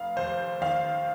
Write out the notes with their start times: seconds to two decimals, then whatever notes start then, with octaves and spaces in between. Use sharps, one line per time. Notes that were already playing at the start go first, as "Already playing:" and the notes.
Already playing: F1 F5
0.16 D#2 C5
0.61 D#3 F5